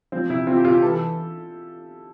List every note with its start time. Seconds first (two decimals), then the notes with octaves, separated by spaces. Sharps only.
0.12 F3 C4
0.29 C3 E4
0.47 C4 F4
0.57 G4
0.64 C3 F4
0.74 G4
0.82 E3 A4
0.93 A4